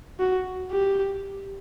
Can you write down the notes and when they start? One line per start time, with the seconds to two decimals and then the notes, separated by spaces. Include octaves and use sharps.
0.19 F#4
0.71 G4